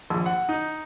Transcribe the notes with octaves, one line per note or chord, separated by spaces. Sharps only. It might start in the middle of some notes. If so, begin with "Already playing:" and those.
A#1
F#5
D#4